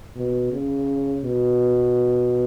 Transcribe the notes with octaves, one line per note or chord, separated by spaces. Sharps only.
B2
C#3
B2